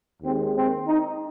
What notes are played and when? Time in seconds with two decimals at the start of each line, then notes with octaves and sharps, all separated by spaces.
0.23 D#2 D#3 G#3 C4
0.55 C4
0.88 D#4